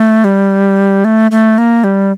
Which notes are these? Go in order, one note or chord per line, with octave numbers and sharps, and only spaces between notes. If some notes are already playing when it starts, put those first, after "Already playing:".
Already playing: A3
G3
A3
A3
A#3
G3